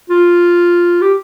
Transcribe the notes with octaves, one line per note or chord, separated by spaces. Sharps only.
F4
G4